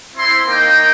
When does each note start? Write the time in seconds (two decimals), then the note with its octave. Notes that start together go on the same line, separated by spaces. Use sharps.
0.16 C4 E4 C6
0.47 A#3 D#4 G5